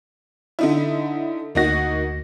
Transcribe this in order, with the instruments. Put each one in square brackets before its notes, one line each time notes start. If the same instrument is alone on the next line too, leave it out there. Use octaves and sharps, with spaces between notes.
[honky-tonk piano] D3 D#4 E4
[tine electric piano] D2 A#6 [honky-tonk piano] A#3 D#4 F#4